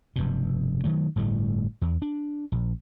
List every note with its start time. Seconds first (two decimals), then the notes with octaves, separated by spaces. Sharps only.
0.16 F1 G2 B2
0.84 D#3 F#3 A3
1.16 G1 A2 G3 A3
1.81 E2
2.02 D4
2.52 A#1